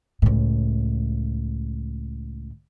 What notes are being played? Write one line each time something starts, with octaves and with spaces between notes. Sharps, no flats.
C#2 A2